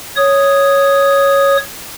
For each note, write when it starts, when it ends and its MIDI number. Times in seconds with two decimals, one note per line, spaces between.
0.17 1.57 73
0.17 1.57 87